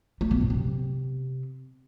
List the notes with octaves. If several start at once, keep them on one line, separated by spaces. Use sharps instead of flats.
A3
B2
F#2
C3